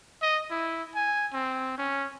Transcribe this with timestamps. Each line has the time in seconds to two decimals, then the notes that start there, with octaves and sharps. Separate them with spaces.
0.22 D#5
0.51 E4
0.95 G#5
1.33 C4
1.78 C#4